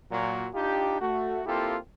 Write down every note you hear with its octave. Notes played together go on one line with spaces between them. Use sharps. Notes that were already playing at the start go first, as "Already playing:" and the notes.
A#2 F#3
D4 D#4 F4 G4
A3 F#4
A#3 C4 E4 F4 G4 A4